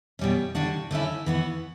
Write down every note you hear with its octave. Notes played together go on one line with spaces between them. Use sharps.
B2 G3 C#4
D3 G3 D4 F#4
D3 A3 C#4 E4
E3 B3 F#4